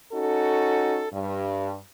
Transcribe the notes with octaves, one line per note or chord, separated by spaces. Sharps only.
C#4 D#4 F#4 A4
G2